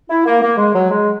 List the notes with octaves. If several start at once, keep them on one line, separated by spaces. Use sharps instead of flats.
E4
A#3
A#3
G#3
F#3
G#3